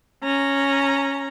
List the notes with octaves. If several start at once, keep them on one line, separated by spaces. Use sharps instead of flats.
C#4 A#5